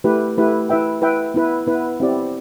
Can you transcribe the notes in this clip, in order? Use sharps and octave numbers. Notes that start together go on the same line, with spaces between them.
A3 E4 G4 B4
A3 E4 G4 B4
E4 B4 E5 G5
E4 B4 E5 G5
B3 E4 B4
B3 E4 B4
C4 E4 G4 D5